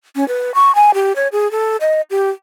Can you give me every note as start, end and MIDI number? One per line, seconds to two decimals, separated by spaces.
0.16 0.27 61
0.28 0.51 71
0.55 0.74 85
0.75 0.91 80
0.94 1.15 67
1.16 1.28 73
1.32 1.50 68
1.51 1.77 69
1.81 2.01 75
2.10 2.30 67